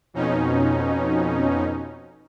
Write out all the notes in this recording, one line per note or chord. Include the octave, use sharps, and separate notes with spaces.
F2 B2 C#4 D#4